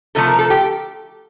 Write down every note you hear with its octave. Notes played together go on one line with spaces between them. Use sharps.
C3 F3 A3 A4
A#4
A4
G4